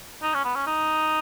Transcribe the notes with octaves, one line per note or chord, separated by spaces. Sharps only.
D#4
C#4
B3
C#4
D#4